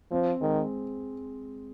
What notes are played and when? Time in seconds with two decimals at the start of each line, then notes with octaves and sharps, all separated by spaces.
0.11 F3 C4
0.41 D#3 G#3